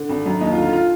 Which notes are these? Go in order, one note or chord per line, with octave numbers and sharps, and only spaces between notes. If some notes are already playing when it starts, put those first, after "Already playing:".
Already playing: D3
G#1
F#2
D#2 D#4
F4
D3
F4
F4